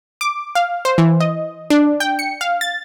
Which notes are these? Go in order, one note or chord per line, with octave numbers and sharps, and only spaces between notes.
D6
F5
C5
E3
D#5
D4
G5
C#7
F5
A6